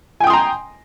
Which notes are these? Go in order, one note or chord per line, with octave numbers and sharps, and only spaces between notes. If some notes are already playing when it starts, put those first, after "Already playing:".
G5 G#5 A#5 C6 D#6